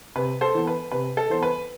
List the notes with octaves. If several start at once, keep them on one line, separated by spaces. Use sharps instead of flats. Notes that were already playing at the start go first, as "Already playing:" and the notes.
C3 B4
A4 C5
E3 B3
B4
C3 B4
A4
E3 B3 C5
B4